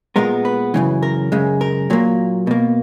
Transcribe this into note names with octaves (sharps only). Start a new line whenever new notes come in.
A#2 G#3 B3 A#4
B4
F#2 C#3 E3
A#4
F#2 C#3 G#3
A#4
A#2 F#3 A#3
B2 A#3